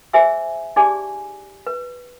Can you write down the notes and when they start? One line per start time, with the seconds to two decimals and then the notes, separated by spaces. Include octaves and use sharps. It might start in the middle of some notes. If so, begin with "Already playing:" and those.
0.13 G#4 C5 E5 G#5 E6
0.76 D#4 G4 G#4 D5 G#5 D6
1.67 B4